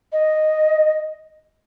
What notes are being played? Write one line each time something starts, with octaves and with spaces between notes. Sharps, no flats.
D#5